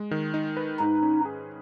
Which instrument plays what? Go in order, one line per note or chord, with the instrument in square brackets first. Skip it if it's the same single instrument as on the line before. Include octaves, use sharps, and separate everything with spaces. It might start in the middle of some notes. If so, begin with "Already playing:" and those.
Already playing: [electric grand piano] G#3
D#3
D#4
B4
[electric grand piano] G#2 [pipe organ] D#4
[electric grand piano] C#4
G#4